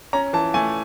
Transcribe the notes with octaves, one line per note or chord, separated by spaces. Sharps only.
C#4 A#5
E3 A5
A3 G#5